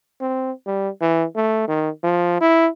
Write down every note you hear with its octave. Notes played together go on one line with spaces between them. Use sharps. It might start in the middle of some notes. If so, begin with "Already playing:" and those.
C4
G3
E3
A3
D#3
F3
E4